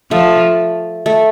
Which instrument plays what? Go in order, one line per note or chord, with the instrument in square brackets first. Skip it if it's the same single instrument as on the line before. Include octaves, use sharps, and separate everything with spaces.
[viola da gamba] F3 [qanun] A3
[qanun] A3